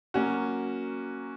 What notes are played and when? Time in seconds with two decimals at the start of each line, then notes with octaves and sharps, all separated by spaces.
0.14 F#3 A#3 C#4 F#4